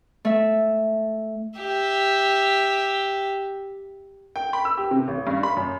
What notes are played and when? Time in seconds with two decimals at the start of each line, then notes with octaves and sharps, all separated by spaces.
0.25 A3 E5
1.58 G4 E5
4.36 G5
4.53 B5
4.65 E6
4.77 G4
4.91 C3
5.08 A1
5.27 G2
5.43 B5
5.57 F#2